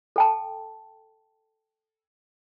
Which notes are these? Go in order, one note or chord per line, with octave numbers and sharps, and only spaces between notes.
A4 G5 A5